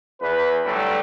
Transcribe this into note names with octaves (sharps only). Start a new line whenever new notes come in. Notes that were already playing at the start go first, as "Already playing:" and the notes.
E2 B4
D3 F#3 G3 A3